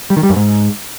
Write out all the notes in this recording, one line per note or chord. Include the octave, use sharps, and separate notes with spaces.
G3
D#3
G3
F#2
G#2